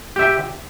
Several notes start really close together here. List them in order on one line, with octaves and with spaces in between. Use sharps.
G4 E5 G5